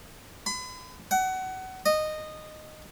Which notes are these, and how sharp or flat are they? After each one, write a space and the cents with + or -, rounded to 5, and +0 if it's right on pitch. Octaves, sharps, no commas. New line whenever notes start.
B5 +40
F#5 +25
D#5 -15